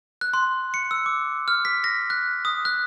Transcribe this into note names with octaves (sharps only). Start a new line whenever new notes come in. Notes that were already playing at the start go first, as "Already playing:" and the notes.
F#6
C6
C#7
E6
D6
F6
B6
A#6
F#6
D#6
F#6